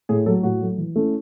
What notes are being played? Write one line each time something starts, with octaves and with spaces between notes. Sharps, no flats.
A2 G#4
F#3 A3 A4
A2 F#4
F#3 A3
E3
A3 C#4 E4